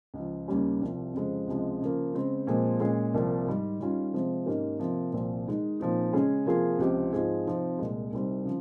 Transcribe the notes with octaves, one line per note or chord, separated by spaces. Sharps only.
C#2 C#3 F3
D#2 C#3 G3 C#4 G4
C2 C3 F3
F2 C#3 F3 G#3 C4
C#2 C3 F3 G#3
C#3 F3 A#3
C#3 G#3 C4
A#2 F3 G#3 C4
A#2 G#3 C#4 G#4
C2 C3 F3 A#3
G#2 D#3 G3
D#3 G3 C#4 F4
C3 F3 G#3 C4
G#2 D#3 A#3 C#4 G4
C3 F3 A#3
C2 A#2 F3 C4
D#3 G#3 D#4
A#2 F3 C4 D#4
C#3 G#3 C#4 G#4
C3 F3 A#3 F4 G#4
C#2 C3 F3 C4 G4
G#2 F3 C4 F4 G#4
C3 F3 C4 D#4
C2 A#2 G#3
C2 C3 G3 C4 D#4
C#3 F3